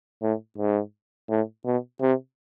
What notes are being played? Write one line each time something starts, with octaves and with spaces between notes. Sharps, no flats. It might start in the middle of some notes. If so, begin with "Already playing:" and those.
A2
G#2
A2
B2
C3